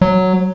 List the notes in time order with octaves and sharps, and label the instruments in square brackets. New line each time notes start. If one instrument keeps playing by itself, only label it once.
[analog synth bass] F#3